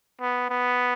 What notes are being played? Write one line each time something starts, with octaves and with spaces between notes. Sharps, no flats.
B3
B3